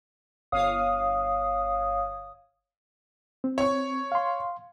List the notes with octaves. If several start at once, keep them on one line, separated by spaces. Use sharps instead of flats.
G1 C#5 F5 D#6
C4
C#5 C#6
F5 C6